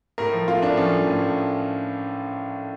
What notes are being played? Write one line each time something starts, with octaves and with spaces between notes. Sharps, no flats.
A2 A#4
F3
A3 F4
A2 D4
F3 C#4
F3
A2
A2